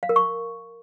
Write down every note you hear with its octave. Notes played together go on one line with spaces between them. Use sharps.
F5
A#4
C#6